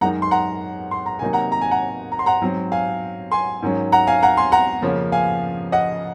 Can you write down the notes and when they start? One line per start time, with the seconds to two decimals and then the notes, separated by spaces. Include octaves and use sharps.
0.01 F#2 D#3 G#3 D#4 F#5 A#5
0.22 C6
0.31 F#5 A#5
0.91 C6
1.06 A#5
1.19 C3 D#3 F#3 A#3 D#4 G#5
1.33 F#5 A#5
1.52 A#5
1.61 G#5
1.71 F#5 A#5
2.12 A#5
2.19 C6
2.26 F#5 A#5
2.42 G#2 F#3 C4
2.72 F5 G#5
3.32 G#5 C6
3.62 G#2 D#3 F#3 C#4
3.92 F#5 A#5
4.07 F5 G#5
4.22 F#5 A#5
4.37 G#5 C6
4.52 F#5 A#5
4.82 F2 C#3 F3 A#3 C#4
5.12 F5 G#5
5.72 D#5 F#5